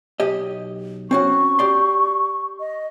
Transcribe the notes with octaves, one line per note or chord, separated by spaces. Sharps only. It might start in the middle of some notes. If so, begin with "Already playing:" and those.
B1 G4 D#5
C4 C#4 F#4 C#6
G4 D5 C6
D#5